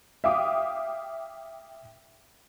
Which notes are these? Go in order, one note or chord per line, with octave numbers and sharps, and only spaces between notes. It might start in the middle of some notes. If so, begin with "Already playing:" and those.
E5 F5 G5 D6 D#6